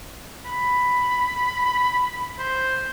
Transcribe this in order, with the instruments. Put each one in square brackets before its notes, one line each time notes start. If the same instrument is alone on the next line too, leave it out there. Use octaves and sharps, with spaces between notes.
[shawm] B5
C5